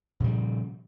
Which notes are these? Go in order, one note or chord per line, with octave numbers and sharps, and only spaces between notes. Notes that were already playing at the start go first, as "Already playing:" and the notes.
A#2 C#3 F3 G3